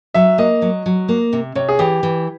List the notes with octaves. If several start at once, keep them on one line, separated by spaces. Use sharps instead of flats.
F#3 E5
A#3 D#5
F#3
F#3
A#3
C3
C3 C#5
G#4
E3 G4
E3